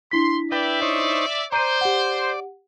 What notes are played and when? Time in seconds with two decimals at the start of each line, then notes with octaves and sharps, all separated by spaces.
0.11 D4 E4 C6 B6
0.52 B4 D5 E5 G5
0.82 D#4 C5 C#5
1.52 C5 D5 A#5 G6 D#7
1.81 G4 F#5